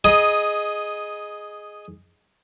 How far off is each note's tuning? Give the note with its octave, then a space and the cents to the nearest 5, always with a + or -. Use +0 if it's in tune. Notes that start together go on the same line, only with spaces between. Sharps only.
G#4 +5 D#5 -5 A#5 +40